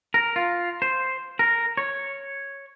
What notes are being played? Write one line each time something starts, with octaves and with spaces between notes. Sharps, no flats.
A#4
F4
C5
A#4
C#5